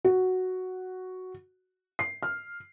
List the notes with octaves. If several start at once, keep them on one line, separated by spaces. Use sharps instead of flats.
F#4
C7
F6